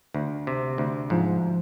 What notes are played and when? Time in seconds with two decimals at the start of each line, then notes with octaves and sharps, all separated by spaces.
0.14 D2
0.47 C3
0.78 D2
1.10 G#2 F3